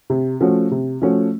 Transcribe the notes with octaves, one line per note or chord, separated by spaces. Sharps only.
C3
F3 A3 C#4 F#4
C3
F3 A3 C#4 F#4